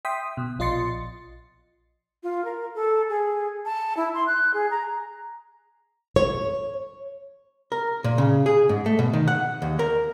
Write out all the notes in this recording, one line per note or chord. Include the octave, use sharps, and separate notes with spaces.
E5 G5 C6 D#6 B6
B2
A#1 F4 D#5 C6 A6 C#7
F4
A#4
A4
G#4
A5
E4
C6
F#6
G#4
A#5
C#5
A#4
A#2
C#3
G#4
G#2
A3
B2
D#3
F#5
D#2
A#4